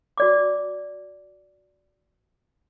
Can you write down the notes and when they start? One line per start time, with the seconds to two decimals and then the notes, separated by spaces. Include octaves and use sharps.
0.18 F#4 D5 D6